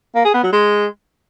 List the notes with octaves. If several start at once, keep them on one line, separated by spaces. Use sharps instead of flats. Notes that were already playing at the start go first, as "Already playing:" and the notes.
A#3
G#4
B3
F#3
G#3